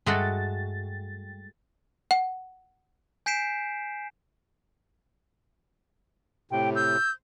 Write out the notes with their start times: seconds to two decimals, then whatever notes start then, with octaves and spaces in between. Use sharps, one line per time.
0.06 G2 G#3 A3 F#4 A6
2.11 F#5
3.26 G#5 G6 B6 C7 D7 E7
6.51 A2 C3 G5
6.76 E6 G6